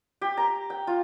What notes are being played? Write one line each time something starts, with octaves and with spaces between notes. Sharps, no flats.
G4
A#5
G5
F4